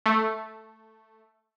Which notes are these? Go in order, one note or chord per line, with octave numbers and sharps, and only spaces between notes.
A3